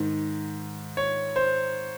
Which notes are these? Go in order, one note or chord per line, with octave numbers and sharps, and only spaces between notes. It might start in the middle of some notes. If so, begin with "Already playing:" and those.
Already playing: G#2 D#3
C#5
C5